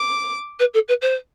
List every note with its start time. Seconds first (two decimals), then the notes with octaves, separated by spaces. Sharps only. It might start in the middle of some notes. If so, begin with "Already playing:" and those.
Already playing: D6
0.59 B4
0.74 A4
0.88 B4
1.01 C5